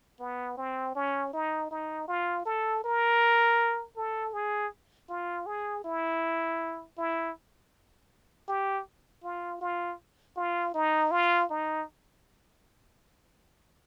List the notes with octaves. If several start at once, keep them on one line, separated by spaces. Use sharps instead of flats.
B3
C4
C#4
D#4
D#4
F4
A4
A#4
A4
G#4
F4
G#4
E4
E4
G4
F4
F4
F4
D#4
F4
D#4